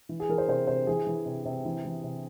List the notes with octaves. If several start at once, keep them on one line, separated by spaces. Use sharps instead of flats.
E3
G#4
E3 A#4
C5
C3 C5
C3 C5
E3 G#4
E3
C3
C3
E3
E3
C3